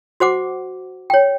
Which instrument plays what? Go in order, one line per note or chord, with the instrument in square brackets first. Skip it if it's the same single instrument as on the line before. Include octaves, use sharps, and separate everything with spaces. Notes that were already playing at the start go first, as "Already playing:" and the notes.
[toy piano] F#4 C5 F#5 D6
C#5 G5